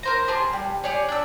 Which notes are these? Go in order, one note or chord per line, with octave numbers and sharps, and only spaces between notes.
A#4 C5 A#5
G4 G#4 A5
G3
G4 G#4 C#5 D5
D4 E6